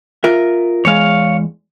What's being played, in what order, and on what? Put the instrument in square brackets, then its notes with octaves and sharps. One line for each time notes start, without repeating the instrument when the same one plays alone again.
[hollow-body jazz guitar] F4 A#4 E5
[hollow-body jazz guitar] E2 G#3 [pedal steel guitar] C#5 F5